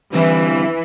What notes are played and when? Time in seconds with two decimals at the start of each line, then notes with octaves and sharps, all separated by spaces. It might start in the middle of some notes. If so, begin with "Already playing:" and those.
0.13 D3 E3 G3 C4